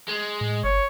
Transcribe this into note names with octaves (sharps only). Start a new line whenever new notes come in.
G#3
A2
G1 C#5